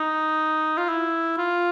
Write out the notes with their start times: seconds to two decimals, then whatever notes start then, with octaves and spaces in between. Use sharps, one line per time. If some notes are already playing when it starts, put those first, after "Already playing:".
Already playing: D#4
0.78 F4
0.89 E4
1.37 F4